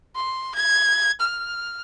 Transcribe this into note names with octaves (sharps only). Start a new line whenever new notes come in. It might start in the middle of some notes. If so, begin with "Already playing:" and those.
C6
G#6
F6